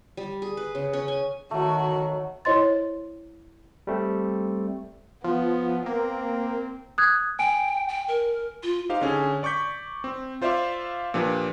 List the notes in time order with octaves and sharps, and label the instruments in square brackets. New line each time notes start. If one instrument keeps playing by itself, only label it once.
[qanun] G3
G#4
B4
C#3
C#4
G#5
[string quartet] D#3 F#4 [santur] F#3 A3
[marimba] E4 C5 C#5 D#5 C6 A6
[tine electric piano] G3 A3 C4
[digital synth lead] F3 [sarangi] B3
[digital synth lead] A#3 [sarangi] C4
[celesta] D#6 F#6 G#6
[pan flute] G5 [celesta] G#5 D7
[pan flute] G5
A#4
F4
[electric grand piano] D#4 G4 C5 F5
D3 C#4 G#4 G#5
D5 C#6 D6 G6 B6
C4
F4 C5 D5 E5 F5 D6
A#2 F3 D4 G4 B4